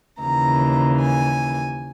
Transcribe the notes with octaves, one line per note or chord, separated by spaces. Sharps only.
D#2 C#3 E3 A#5
G#5